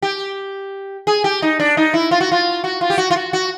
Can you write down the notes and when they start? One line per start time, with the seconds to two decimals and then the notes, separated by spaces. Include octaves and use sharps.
0.02 G4
1.07 G#4
1.24 G4
1.42 D#4
1.60 D4
1.77 D#4
1.94 E4
2.11 F4
2.21 F#4
2.32 F4
2.64 F#4
2.81 F4
2.90 G4
2.98 F#4
3.11 F4
3.16 F#4
3.33 F#4